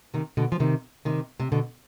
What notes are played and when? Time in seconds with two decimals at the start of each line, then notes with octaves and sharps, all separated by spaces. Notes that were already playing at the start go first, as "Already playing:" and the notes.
0.14 C3 D#3
0.37 B2 D3
0.52 F3
0.60 C3 D#3
1.05 C3 D#3
1.40 C3
1.52 B2 D3